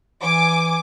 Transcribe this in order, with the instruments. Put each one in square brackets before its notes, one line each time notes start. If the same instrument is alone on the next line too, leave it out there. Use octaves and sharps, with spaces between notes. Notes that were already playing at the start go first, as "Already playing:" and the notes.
[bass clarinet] E3 [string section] G#5 D6